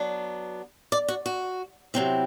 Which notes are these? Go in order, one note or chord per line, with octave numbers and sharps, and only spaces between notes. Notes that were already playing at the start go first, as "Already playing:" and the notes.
Already playing: F#3 B3 D4
D5
F#4
F#4
C3 F#3 C4 E4